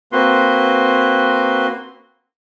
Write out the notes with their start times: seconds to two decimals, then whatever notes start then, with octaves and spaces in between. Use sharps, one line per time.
0.12 A#3 C4 F#4 B4 C6